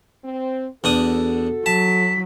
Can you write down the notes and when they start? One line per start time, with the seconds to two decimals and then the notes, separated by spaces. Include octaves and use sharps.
0.24 C4
0.84 E2 D4 F#4 A4 D#6
1.66 F#3 A5 B6